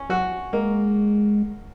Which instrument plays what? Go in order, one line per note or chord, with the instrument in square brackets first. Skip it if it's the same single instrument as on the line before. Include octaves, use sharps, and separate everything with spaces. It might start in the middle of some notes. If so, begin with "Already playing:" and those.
Already playing: [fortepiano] C#4
[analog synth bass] F#3 [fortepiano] F#4
[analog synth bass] G#3 [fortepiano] A#3